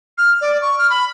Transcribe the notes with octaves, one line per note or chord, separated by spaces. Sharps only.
F6
D5
C#6
F6
B5